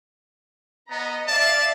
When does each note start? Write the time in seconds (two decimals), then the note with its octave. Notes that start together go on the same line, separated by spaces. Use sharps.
0.91 B3 D#5 A#5
1.28 D5 E5 F5 A5